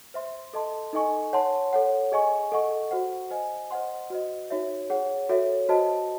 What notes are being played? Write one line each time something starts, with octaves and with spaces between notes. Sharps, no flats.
C5 E5 C6
A4 D#5 A5 C6
D#4 A4 D#5 G#5 C#6
C#5 F#5 A5 C6
A4 C#5 F#5
G#4 D#5 G#5 C#6
A4 D#5 F#5 C#6
F#4 C5 F#5
C5 D#5 G#5
C5 D#5 F#5 C6
F#4 C5 D#5
D#4 F#4 C#5 E5
G#4 C#5 F#5
F#4 A4 C#5 E5
F#4 C5 D#5 A5